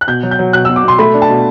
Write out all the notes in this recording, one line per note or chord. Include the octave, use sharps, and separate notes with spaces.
F#6
B2 G6
F#3
G6
F#3
B2 F#6
B2 E6
D6
B2 C6
A3 B5
D4
A5
B2